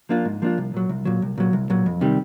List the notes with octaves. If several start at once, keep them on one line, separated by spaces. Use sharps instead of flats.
F3 A#3 D4 F4
G#2
F3 A#3 D4 F4
C2
A#2 F#3
C2
A#2 F#3
C2
A#2 F#3
C2
A#2 F#3
F2
C3 D#3 G3